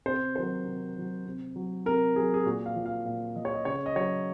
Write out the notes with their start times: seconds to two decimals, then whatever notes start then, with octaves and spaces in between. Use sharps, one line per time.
0.06 C3 C5
0.36 D#3 F#3 C5
0.66 C3
0.95 D#3 F#3
1.26 C3
1.56 F#3
1.86 C3 A#4
2.16 F#3 G#4
2.34 G#4
2.45 A#2 F#4
2.66 F5
2.76 F3
2.86 F5
3.05 A#2 F5
3.36 F3 D#5
3.45 C#5
3.54 D#5
3.65 C#3 C#5
3.86 D#5
3.96 F#3 C#5